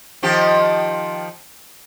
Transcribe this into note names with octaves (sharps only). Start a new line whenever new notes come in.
D#3 F3 G4